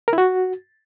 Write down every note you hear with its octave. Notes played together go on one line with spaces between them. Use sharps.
A#4
E4
F#4